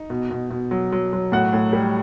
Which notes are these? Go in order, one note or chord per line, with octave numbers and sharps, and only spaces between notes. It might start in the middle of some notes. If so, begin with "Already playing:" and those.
Already playing: D#4
B2
B2
B2
F#3
F#3
F#3
A2 F#4 F#5
A2
G3